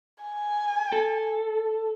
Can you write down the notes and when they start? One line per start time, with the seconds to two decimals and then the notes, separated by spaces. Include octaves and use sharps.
0.24 G#5
0.92 A4